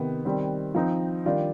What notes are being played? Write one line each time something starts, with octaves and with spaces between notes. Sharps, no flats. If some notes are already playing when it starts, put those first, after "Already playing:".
Already playing: C3 D#3 B3
D#3 G3 C4
F3 C4 D#4
D#3 G3 D4 F4